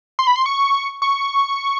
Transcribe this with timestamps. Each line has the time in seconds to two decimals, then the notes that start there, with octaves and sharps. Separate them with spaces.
0.19 C6
0.27 B5
0.36 C6
0.46 C#6
1.02 C#6